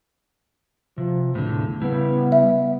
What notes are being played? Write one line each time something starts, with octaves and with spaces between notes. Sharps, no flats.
C3 F3
E2 A2 D3
C#3 G3 B3 E4
E5